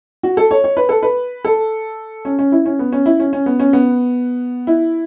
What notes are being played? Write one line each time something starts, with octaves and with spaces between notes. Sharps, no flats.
F#4
A4
C#5
C#5
B4
A4
B4
A4
C#4
C#4
E4
C#4
B3
C#4
E4
C#4
C#4
B3
C#4
B3
E4